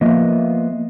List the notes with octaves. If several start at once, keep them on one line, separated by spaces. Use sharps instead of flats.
F3 A#3 B3 F4 D#5 E5